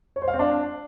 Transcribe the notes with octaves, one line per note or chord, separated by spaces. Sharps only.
C#5
C5
F5
C4
D4